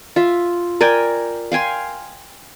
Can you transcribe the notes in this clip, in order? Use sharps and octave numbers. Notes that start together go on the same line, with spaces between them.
F4 E5
A#4 D5 G5 G#5
F5 G5 G#5 C6